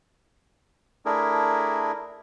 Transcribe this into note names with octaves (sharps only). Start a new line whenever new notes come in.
A3 D4 E4 G#4 A#4